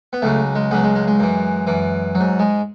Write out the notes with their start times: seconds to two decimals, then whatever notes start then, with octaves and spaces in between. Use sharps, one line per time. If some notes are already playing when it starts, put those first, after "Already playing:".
0.13 B3
0.22 C#2 C#3 F#3 A3
0.55 G#3
0.71 C#2 C#3 F#3 B3
0.83 G#3
0.95 G#3
1.08 G#3
1.20 F#2 E3
1.67 F#2 E3
2.15 F#3
2.20 G#2
2.39 G#3